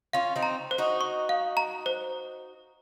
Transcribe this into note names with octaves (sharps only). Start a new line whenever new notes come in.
C#4 F4 F5
C4 D#4
A#5
C5
D#4 F#4
C#6
F5
A#5
C5